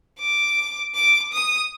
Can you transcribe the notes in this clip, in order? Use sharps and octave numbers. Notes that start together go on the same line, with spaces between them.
D6
D6
D#6